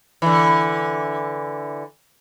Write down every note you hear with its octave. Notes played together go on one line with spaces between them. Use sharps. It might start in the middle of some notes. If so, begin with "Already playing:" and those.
D3 E3